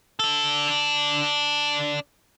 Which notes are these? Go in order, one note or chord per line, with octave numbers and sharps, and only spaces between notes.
D4 A4